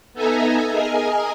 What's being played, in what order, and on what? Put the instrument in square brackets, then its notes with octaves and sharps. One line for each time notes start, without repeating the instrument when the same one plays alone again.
[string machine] B3 D#4 A4 E5 G#5 A#5
G#4 A#4 D#5 G#5